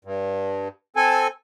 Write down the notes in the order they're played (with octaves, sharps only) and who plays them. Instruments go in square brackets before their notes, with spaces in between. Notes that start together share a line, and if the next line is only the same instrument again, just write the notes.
[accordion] G2
C4 A4 G#5